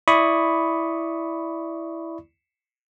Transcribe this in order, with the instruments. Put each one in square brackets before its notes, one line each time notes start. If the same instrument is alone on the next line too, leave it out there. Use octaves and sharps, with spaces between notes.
[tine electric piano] E4 D5 B5 C#6 D#6